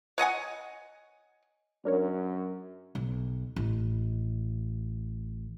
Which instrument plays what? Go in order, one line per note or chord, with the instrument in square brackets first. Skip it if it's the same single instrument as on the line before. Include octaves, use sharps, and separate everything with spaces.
[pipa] C#5 D#5 F#5 G#5
[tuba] F#2 [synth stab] D4 A#4 C#5
[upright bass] B1
A1